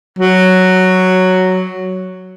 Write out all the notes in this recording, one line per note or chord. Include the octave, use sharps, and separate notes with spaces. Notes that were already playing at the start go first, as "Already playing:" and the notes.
F#3